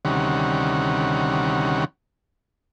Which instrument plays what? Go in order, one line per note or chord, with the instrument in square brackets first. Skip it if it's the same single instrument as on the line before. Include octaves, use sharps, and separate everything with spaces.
[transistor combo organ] D2 C3 D#3 G3 C#4 F#5